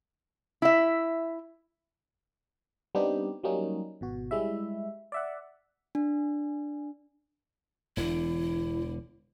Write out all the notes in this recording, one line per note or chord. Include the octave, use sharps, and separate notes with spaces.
E4 E5
G3 B3 C4 D4 D#4 G4
F#3 G3 A#3 C#4 D#4
G#1 B2 F#4
G3 G#3 E4 E5
D5 E5 F#5
D4
E1 E2 D3 E4